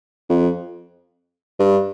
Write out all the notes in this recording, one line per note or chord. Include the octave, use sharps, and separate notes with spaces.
F2
G2